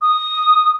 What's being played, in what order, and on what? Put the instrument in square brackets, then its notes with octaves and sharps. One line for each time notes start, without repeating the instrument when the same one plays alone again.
[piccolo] D#6